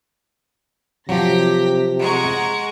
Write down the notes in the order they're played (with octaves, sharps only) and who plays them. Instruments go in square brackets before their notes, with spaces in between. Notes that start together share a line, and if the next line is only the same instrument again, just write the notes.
[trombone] C3 [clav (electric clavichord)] F3 F#3 [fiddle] G4 [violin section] A#6 B6
[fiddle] G#3 G#4 [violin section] F#5 A#5 C#6